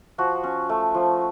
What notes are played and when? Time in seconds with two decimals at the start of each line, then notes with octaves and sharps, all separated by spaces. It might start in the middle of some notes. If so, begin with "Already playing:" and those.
0.18 F3 F#4
0.44 C#4
0.69 A3
0.95 F3